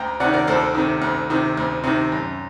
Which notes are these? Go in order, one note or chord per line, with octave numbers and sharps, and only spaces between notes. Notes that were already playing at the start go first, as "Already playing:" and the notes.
Already playing: D2 G5 A#5
C3 D#3 D5 F#5
A#4 D5
D2 A4 C5
C3 D#3
D2
C3 D#3
D2
C3 D#3
F#2